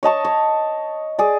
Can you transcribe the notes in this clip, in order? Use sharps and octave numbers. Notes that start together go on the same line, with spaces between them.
C#5 D#5 A5 C#6
C#5
G#4 D5